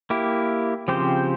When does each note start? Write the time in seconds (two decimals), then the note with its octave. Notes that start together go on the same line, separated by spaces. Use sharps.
0.10 A#3 E4 G4
0.88 C#3 F3 C4 G4 C5